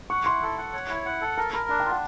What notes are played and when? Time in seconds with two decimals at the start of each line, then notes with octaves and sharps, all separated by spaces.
0.10 F#5 C#6
0.26 E4 C6
0.42 A4
0.58 F#5
0.73 C#5
0.90 E4
1.06 F#5
1.21 A4
1.37 A#4 A5
1.53 A#4 B5
1.69 D4 B5
1.80 G5
1.85 F4
1.90 F#5